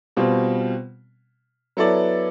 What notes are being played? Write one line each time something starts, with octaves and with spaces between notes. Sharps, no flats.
B2 G3 C4 F4
F#3 B3 E4 A4 D5